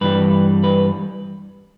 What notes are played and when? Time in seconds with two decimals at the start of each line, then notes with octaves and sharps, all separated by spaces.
0.01 G2 E3 G3 B4
0.64 B4